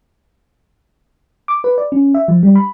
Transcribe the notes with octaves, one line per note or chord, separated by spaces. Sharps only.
D6
B4
D5
C#4
E5
F3
G3
B5